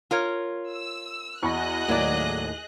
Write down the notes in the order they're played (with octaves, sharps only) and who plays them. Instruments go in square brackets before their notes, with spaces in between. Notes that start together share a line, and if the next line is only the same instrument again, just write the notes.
[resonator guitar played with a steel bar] F4 A#4 C#5
[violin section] E6
[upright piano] E2 B5 A#6 [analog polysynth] F#4 [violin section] G#4 D#5 F#6
[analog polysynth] D#2 A2 [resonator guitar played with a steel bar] F#3 D5 [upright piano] A#3